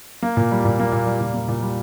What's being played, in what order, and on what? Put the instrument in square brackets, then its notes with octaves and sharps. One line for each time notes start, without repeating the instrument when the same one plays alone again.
[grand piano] A#3
A#2
G3
A#2
A#3
A#2
G3
A#2
A#3
A#2
G3